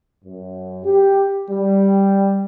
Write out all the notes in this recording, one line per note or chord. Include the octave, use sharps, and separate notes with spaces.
F#2
G4
G3